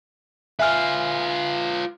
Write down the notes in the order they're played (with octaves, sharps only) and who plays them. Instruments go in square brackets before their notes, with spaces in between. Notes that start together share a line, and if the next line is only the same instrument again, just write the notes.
[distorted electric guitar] F4 B4 [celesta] E5 G#5 F6